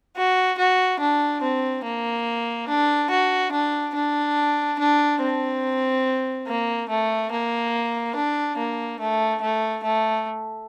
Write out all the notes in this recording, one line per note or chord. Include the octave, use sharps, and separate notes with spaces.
F#4
F#4
D4
C4
A#3
D4
F#4
D4
D4
D4
C4
A#3
A3
A#3
D4
A#3
A3
A3
A3